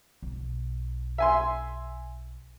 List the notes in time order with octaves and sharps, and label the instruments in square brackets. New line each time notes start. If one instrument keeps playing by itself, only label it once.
[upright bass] B1
[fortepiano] E5 G#5 C6